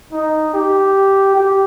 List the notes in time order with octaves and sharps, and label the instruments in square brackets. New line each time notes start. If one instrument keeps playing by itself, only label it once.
[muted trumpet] D#4
G4
G4